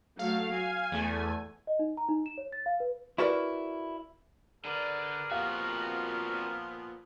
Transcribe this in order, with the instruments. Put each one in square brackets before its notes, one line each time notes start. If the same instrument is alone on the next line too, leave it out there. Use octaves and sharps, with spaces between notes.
[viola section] F#3 A3 [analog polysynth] F5
[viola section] G#5
[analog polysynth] E2 A3
[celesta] D#5
D#4
A#5
D#4
E7
C#5
A6
F5
B4
[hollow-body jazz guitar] E4 F#4 A#4 B4 D5
[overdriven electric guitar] D3 [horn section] G#4 B4 D5 [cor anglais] A#4
[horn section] A#2 F3 B3 [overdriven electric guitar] C4 F#4 [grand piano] G4 F5